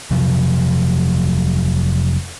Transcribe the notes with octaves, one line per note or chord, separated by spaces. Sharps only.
F2 C3 F3 F#3